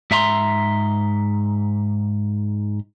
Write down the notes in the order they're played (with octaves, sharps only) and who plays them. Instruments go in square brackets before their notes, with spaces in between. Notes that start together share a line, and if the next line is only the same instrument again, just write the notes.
[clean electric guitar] G#2 E5 A#5 C6